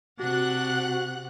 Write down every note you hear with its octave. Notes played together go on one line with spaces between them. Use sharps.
C3 D4 F#4 F#5 F#6